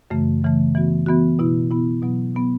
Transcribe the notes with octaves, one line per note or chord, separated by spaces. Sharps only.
F#2 C#3 E3 A3
F#2 C#3 E3 A3
E3 B3 F#4
E3 B3 F#4
B2 B3 E4
B2 B3 E4
B2 F#3 B3
B2 F#3 B3